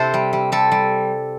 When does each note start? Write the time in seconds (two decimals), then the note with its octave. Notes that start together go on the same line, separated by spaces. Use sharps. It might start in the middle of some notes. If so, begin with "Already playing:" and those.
Already playing: C3 E4 A4 C5
0.14 G3
0.33 G3
0.52 G3 A4
0.72 G3